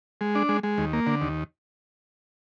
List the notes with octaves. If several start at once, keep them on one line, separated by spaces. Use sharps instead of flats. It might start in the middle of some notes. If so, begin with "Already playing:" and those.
G#3
D4
G#3
G#3
D#2
A#3
D3
D#2